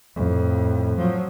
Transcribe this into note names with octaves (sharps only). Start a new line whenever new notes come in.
F2 A2
F3 F#3